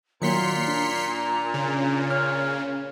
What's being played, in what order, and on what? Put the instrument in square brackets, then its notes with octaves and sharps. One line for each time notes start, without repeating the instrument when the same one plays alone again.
[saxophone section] A#2 [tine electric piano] D#3 F#3 A#3 [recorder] A#5 [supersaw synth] C6 B6 C#7
[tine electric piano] D4
[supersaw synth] C#3
[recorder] C#5 [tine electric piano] F6